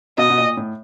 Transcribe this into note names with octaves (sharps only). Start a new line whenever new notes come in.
B2 D#5
B2
A#2
A2